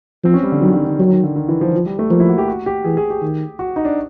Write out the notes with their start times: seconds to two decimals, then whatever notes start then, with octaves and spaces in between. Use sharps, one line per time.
0.24 F3 C4
0.34 C#4
0.43 G3
0.52 D3
0.61 D#3 F#3
0.74 D3
0.87 D3
0.99 D#3 F#3
1.11 D#3
1.24 D3
1.36 D#3
1.49 E3
1.61 F3
1.73 F3
1.86 G3
1.99 A3
2.10 F3 A#3
2.20 E4
2.29 F#4
2.38 G4
2.48 F#4
2.66 G4
2.84 E3 G#4
2.97 G#4
3.10 G4
3.22 D#3
3.59 F#4
3.76 D#4
3.85 D4